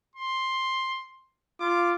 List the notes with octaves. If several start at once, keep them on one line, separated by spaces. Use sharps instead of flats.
C6
F4 D6